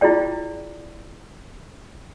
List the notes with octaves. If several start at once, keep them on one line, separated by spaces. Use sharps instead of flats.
E4 F4 G#4 D5 G5